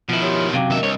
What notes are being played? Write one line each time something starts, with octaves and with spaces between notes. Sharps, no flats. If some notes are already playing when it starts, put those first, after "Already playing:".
B2 D#3 F3 E4
G4 C#5 C6
F#2 C3 F#3 F5 G5 D6
D#2 D4 A#4 D#5 E5
C2 C#5